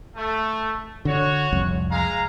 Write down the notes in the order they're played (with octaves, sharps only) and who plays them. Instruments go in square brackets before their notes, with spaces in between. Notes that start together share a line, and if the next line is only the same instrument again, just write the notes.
[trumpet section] A3
[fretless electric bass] D3 [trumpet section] F#4 C#5
[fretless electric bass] C2 F2
[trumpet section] G#3 F5 A#5